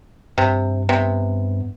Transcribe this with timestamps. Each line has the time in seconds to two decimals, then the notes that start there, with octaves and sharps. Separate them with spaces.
0.38 G2 C3
0.89 C3 B3